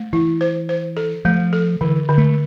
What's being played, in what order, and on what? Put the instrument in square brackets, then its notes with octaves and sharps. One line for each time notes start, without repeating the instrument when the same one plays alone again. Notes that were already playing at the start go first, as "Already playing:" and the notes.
Already playing: [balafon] A3
[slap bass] E3 [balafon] E4
[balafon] C5
C5
A4
[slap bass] F3 [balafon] A3
[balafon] A4
[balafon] D3 [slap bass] E3
[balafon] D3
[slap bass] A3